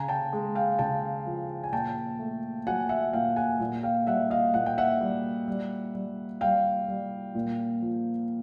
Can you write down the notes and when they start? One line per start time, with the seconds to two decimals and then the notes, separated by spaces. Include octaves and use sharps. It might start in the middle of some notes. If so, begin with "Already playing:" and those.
Already playing: C#3 G#5 A#5
0.08 G5 A5
0.33 G#3
0.55 F5 G5
0.79 C#3 G5 A5
1.26 F3
1.64 G#5
1.72 A#2 G5 A5
2.19 A3
2.67 F#3 F#5 G#5
2.89 E5 F#5
3.13 A#2 F5 G5
3.36 F#5 G#5
3.60 A#2
3.83 F5 G5
4.07 G3 E5 F#5
4.30 D#5 F5
4.54 A#2 F#5
4.66 G5
4.78 E5 F#5
5.01 G3
5.48 G3
5.95 G3
6.41 G3 F5 G5
6.88 G3
7.35 A#2
7.82 F3